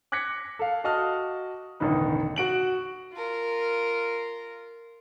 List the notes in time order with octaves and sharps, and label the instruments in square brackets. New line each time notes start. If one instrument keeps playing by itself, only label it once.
[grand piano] D6 F#6 G#6 A#6 B6 C#7
A4 F5
F#4 D#5 A5 D#6 F6
E1 A1 D3 D#3 D#4 B4
F#4 D7 F#7
[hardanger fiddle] F4 A#4